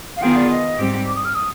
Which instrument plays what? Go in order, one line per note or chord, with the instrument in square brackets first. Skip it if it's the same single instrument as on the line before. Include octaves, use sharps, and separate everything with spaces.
[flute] F5
[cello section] D#3 B3 F4 G#4 [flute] G5
[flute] D5
D#5
[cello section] G#2 G3 C4 G4
[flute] D6
D#6
F6
D#6